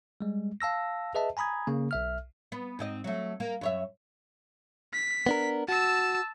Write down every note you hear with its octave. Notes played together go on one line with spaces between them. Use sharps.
G3 G#3
F5 A5 E6 A#6
G#4 B4 D#5 E5 A5
G#5 A#5 B5 D#6 G#6
C#3 A#3
B1 E5 F6
B3
G#2 C4 D#5
F#3 A3
A#3
F#2 C#5 E5
B6
B3 D4 A#4
F#4 A5 E6